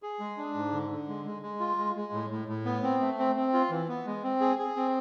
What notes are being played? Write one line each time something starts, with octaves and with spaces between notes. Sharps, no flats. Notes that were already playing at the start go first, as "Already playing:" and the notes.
G#4
G#3
D4
G#2
D3
D3
G#3
G#3
G#3
F4
G#3
G#3
A2
A2
A2
B3
C4
A3
C4
C4
F4
E3
B3
G#3
C4
G#4
G#4
C4